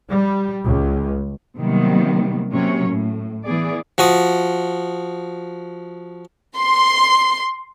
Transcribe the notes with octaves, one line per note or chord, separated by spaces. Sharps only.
G3
C#2
C3 D#3 F#3 G3 A#3 B3
C3 F#3 A#3 C#4 C#5
A2
E3 B3 G#4 D5
F3 F#4 D#6
C6